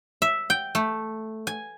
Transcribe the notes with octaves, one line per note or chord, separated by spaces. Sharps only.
E5
G5
A3
G#5